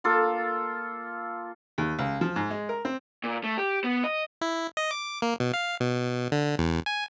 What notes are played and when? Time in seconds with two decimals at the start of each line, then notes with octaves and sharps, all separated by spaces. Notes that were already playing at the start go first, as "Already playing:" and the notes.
0.04 A#3 F4 A4
1.78 D#2
1.99 C#2
2.21 F3
2.36 G#2
2.51 G#3
2.69 A#4
2.85 C4
3.24 A#2
3.44 A3
3.58 G4
3.84 B3
4.04 D#5
4.41 E4
4.77 D#5
4.91 D6
5.22 A#3
5.40 B2
5.54 F5
5.80 B2
6.32 D3
6.58 E2
6.86 G#5